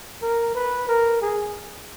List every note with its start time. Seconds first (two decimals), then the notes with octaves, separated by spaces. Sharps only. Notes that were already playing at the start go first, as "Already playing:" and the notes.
0.22 A#4
0.55 B4
0.88 A#4
1.22 G#4